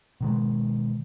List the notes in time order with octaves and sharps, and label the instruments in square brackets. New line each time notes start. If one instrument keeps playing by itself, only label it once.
[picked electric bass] B2 D#3 G#3